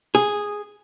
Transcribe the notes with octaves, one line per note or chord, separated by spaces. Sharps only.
G#4